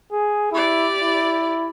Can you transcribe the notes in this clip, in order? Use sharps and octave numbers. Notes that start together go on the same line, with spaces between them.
G#4
E4 G4 D5
E4